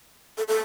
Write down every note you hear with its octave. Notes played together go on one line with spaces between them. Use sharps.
A4
A4